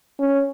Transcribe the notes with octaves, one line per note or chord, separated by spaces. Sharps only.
C#4